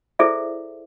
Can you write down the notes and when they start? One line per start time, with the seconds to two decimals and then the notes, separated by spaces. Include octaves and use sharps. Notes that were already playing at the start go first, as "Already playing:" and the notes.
0.19 E4 G#4 A4 C5 D5 E5